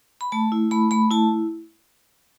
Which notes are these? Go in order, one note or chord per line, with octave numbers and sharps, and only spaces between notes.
B5
A3 A5
E4
A3 B5
A3 B5
E4 A5